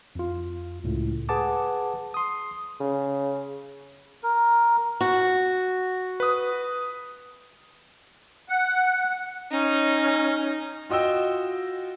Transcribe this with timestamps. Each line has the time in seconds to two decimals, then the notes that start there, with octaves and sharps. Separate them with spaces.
0.15 F2 F4
0.84 C#2 A2
1.29 G#4 B4 F#5 A5 D6
2.14 C6 D#6
2.80 C#3
4.23 A#4
5.01 F#4
6.20 B4 D#6
8.49 F#5
9.51 C#4 D#4
10.89 F4 F#4 D#5 G5 E6